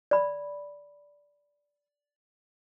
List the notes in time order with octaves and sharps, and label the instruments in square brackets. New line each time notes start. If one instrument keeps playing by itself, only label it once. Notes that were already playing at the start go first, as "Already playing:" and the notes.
[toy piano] D5 B5